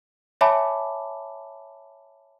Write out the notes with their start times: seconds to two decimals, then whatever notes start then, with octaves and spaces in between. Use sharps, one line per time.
0.41 C#5 E5 G#5 A5 B5 D6